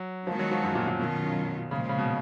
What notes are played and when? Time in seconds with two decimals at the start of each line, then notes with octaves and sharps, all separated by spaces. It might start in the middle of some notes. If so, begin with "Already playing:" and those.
Already playing: F#3
0.27 D#3 F3 G#3 B3 F#4
0.39 F#3
0.51 F3
0.63 F#2
0.75 A#2
0.88 A#2
0.99 B2 D#3 F#3 C#4 F4
1.71 A#2 C#3 F3 G#3
1.89 C#3
1.98 B2